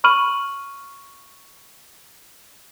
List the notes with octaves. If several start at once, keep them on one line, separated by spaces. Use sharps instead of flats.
B5 C#6 F6 D#7 F#7